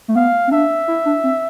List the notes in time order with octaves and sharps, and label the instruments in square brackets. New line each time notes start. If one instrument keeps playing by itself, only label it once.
[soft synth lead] A3
[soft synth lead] B3 [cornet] F5
[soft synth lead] C4
[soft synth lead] D4 [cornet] E5
[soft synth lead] E4
D4
C4